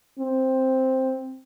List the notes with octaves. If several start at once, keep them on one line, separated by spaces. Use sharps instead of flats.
C4